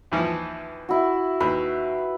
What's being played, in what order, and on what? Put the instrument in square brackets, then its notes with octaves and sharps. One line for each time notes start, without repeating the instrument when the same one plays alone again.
[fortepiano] D#2 E3 F3
[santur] E4 F#4
[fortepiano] D#2 [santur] B4